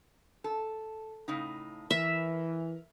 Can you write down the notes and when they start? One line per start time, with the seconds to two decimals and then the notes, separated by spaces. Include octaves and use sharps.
0.44 A4
1.28 A2 C#3 D#4
1.91 E3 A#4 E5